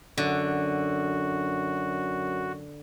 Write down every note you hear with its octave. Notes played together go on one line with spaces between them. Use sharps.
F#2 D3 F#4